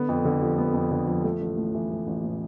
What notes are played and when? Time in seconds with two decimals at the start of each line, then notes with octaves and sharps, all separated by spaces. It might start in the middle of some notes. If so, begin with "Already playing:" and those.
Already playing: D3 B3
0.09 F2
0.25 D3
0.42 F3
0.58 B3
0.74 F2
0.91 D3
1.07 F3
1.24 A3
1.41 A1
1.57 A2
1.74 E3
1.91 A3
2.07 A1
2.24 A2